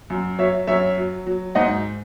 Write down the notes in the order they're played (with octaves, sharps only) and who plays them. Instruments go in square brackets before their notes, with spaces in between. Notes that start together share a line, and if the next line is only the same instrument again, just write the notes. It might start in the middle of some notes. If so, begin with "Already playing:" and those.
[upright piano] F#2
F#3 C#5 E5
F#2 C#5 E5
F#3
F#3
G#2 D#5 F#5